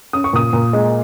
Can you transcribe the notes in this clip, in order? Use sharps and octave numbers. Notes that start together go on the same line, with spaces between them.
C#4 D#6
C#6
A#2 D#6
A#2
G#3